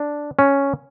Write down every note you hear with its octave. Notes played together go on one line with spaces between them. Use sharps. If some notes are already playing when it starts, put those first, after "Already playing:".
Already playing: D4
C#4